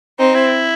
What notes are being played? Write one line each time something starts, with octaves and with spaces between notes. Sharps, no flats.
C4 D#4 C5
E4